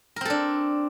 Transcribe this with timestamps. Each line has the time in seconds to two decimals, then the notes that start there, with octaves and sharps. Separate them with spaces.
0.16 A#4
0.21 C4
0.25 A4
0.30 D4